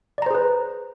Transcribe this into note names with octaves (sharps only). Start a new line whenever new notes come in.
G#4 B4 C5 D5 A#5